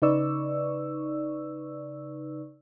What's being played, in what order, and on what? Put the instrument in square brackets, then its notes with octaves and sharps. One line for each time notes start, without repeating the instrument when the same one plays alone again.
[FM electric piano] C#3 D#4 B4 D5 C#6 E6